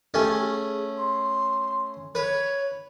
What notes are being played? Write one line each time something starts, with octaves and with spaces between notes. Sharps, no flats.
A3 C#4 G4
G#4
C6
B4 C#5